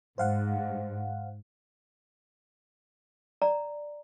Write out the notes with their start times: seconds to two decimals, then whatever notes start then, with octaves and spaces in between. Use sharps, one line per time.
0.18 G#2 C5 F5 F#5
3.42 D5 A#5